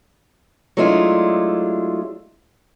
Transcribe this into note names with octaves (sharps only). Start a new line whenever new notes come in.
F#3 G#3 A3 D4 E4 F4